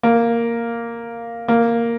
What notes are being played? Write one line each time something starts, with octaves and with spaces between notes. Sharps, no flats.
A#3
A#3